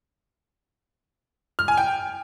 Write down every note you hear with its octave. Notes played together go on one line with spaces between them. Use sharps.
F6
G#5
G5